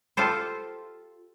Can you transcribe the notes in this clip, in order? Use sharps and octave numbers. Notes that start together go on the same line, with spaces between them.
F4 G4 A4 C5